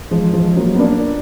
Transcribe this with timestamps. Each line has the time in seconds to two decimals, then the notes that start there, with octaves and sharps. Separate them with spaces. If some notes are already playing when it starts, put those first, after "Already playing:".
0.11 F3 G#3
0.33 F3 G#3
0.56 F#3 A#3
0.75 B3
0.79 A#3 D4